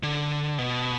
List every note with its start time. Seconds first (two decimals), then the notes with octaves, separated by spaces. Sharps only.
0.03 D3
0.58 B2